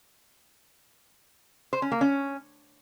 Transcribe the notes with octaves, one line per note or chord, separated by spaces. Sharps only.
C5
C#4
A#3
C#4